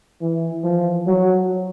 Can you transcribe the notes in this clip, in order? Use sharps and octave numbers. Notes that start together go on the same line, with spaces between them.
E3
F3
F#3